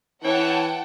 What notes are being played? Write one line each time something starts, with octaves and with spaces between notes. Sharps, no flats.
E3 C#5 F#5 G5 A5